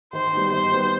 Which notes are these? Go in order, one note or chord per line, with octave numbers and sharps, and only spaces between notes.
D#3 C5
G3 B3 D#4
D#3 C5
G3 B3 D#4